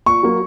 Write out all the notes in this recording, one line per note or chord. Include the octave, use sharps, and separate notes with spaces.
A#2 C#6
F#3 A#3